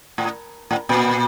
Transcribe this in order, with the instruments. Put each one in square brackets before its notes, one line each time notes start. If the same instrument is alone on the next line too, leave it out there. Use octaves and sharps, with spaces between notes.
[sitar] A2
A2
A#2